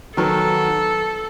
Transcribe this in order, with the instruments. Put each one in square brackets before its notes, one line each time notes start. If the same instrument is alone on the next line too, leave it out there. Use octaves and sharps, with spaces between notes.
[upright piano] D#3 F#3 B3 [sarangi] A4